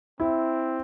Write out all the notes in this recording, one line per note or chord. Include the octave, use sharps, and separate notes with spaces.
C4 E4